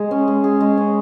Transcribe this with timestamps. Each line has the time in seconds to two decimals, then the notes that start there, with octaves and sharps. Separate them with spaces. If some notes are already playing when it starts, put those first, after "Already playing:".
Already playing: G#3 G#4
0.11 C#4
0.28 G#3
0.44 G#4
0.60 G#3
0.77 C#4